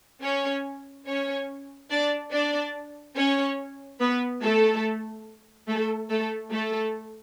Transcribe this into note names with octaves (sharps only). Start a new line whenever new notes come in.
C#4 C#5
C#4 C#5
D4 D5
D4 D5
C#4 C#5
B3 B4
A3 A4
A3 A4
A3 A4
A3 A4